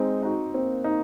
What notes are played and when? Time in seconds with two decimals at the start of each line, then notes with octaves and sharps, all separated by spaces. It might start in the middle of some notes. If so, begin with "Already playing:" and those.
Already playing: G#3 C4 D#4
0.23 D#4 F#4
0.54 A#3 C4
0.84 D#4